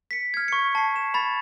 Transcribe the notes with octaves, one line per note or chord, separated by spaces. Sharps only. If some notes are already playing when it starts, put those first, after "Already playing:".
B6 C#7
F6 G#6
C#6 C#7
A5 C7
E7
B5 A6